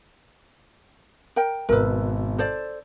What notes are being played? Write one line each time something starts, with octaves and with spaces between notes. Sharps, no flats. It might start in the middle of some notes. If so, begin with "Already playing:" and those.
A#4 G5
G#1 B2 A#4 B4 E6
A4 C5 D5